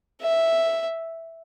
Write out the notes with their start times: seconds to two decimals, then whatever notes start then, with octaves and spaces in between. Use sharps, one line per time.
0.22 E5